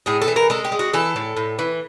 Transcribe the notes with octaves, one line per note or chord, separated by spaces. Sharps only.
A2 G#4
A4
E3
A#4
G#3 A4
G4
G#3
F#4
E3 A4
A2
A2
E3